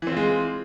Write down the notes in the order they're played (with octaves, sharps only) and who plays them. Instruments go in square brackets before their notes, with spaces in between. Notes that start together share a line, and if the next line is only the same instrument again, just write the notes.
[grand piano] E3
C4
F4
G#3